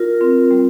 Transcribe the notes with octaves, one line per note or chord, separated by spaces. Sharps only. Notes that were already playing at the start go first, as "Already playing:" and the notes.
Already playing: F4 A#4
C4
G3